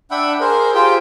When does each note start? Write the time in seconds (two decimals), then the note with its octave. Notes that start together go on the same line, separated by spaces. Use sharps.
0.11 D4 E5 F#5 G5 B5
0.40 G#4 A#4 C5
0.75 F4 G4 G#4 C5 G5